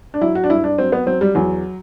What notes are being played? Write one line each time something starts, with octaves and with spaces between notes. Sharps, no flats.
D4
F#3 E4
F#4
D4
G2 E4
D4
F#3 C4
B3
F#3 C4
G3
E2 F#3